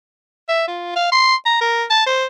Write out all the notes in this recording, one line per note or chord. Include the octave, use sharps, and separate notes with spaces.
E5
F4
F5
C6
A#5
A#4
A5
C5